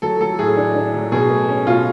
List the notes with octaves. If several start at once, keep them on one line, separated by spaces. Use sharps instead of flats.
F#3 A4
F#3 A4
A2 G#4
D4
D4
F#3
B2 G#4
A3
C#4
B2 F4